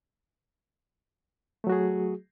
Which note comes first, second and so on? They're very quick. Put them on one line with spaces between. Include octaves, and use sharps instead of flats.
A3 F#3 F#4 G#4